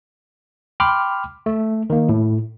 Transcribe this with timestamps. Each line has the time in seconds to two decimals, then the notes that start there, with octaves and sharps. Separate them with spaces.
0.80 G5 B5 C6 D6 F6
1.46 A3
1.90 D#3 A#3
2.09 A2